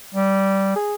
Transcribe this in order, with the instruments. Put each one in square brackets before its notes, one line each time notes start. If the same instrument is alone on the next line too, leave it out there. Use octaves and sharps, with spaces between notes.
[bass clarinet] G3
G#4